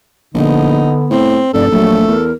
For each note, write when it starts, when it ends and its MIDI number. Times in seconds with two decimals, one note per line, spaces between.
0.34 0.87 34
0.34 1.13 50
0.34 1.37 59
0.34 0.99 63
1.11 1.41 45
1.11 1.52 60
1.54 1.69 29
1.54 1.68 43
1.54 2.26 69
1.54 1.65 74
1.71 2.05 34
1.71 2.00 54
1.71 2.16 57
2.08 2.32 40
2.08 2.32 70